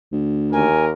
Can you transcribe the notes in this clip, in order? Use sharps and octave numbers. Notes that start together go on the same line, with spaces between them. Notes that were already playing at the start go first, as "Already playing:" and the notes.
D2
D#2 A#4 G#5